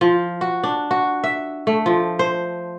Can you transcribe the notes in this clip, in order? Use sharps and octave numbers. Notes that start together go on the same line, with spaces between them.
F3
F#4
D4
F#4
E5
A3
F3
C5